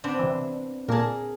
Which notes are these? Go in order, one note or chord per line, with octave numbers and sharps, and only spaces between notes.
B3 C4 D4
C3 E3
A#2 A#3 G#4 A#4 A5